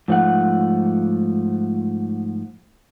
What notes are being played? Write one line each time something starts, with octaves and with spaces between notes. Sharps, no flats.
G#2 F3 A3 F#5